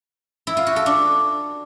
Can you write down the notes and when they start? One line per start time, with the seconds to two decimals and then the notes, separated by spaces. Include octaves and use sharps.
0.47 E4
0.57 F4
0.67 F#4
0.76 A4
0.86 D4